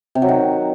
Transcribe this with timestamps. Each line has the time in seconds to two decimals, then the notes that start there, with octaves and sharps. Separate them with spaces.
0.15 C3
0.22 F#3
0.29 D#3